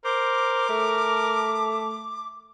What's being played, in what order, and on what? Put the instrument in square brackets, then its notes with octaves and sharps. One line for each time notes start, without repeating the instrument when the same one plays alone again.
[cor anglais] A#4 [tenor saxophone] C5 [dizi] D6
[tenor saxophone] A3